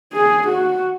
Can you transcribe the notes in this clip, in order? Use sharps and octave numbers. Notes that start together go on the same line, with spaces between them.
G#4
F#4